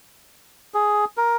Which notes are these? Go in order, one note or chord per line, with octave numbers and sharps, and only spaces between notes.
G#4
A#4